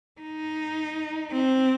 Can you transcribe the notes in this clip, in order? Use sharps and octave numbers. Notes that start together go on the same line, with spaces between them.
D#4
C4